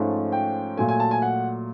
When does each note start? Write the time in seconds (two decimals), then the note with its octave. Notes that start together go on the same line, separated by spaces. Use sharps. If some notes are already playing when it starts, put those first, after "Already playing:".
Already playing: G#2 F3 A3 C#4
0.32 G5
0.77 A#2 F#3 A3 G#5
0.88 G#5
1.00 A5
1.11 G#5
1.22 F#5